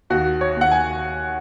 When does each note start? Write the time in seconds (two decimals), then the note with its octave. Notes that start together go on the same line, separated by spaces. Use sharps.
0.10 D#2 F#4
0.41 C#5
0.57 D#2 F#5
0.72 G#5